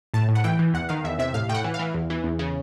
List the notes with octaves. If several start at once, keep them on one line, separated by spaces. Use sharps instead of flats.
A2 A5
A2
F#5
E3 G5
E3
E2 F#5
D#3 F5
E2 E5
C3 E5
A2 F5
A2 G5
F#5
E3
F5
E3
E2
E3
E2
C#3